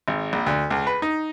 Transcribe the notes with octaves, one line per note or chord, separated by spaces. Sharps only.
G#1
A#1
D2
C#2
B4
D#4